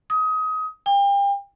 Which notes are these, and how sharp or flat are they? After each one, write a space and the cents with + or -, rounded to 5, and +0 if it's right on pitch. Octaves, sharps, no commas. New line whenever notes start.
D#6 +25
G5 +35